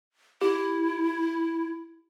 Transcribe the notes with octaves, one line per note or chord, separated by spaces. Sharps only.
E4 G4